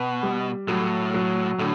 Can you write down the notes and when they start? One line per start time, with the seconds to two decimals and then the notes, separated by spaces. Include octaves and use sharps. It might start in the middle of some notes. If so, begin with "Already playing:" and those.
Already playing: B2 B4
0.23 G3
0.68 A2 F#3
1.14 F#3
1.59 A2 D3